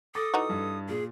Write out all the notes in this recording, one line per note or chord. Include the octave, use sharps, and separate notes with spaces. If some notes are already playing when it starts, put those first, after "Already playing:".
A4 D6 D#6 A6 A#6
E3 D#4 F#4
G2
A#2 G#4